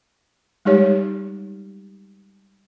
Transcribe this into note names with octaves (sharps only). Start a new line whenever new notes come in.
G3 G#3 D#4 G4 C#5